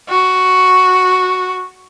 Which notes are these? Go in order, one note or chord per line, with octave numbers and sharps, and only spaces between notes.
F#4